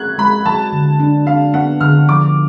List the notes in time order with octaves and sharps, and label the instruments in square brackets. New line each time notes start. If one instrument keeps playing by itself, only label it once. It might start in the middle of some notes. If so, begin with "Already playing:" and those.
Already playing: [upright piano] F#6 G#6
[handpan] G#3 [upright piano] B5
[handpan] F#3 [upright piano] A5
[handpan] D3
D4
[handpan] D4 [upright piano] F5
[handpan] B3 [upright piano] F#5
[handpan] D3 [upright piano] F6
[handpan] F3 [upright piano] D6